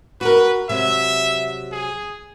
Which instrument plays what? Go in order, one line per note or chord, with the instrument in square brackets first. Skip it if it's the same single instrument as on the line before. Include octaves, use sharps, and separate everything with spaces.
[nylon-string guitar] F#4 A#4 [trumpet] B4
[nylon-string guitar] C3 F#3 G#3 [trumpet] E5
[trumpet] G#4